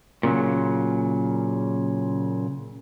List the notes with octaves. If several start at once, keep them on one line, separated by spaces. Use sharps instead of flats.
A#2 C#3 F#3